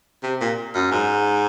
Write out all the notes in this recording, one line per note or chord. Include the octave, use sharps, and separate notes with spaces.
C3
A#2
F#2
G#2